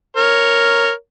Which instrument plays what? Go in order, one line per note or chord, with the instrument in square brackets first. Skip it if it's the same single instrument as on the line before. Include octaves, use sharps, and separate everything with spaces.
[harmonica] A#4 C#5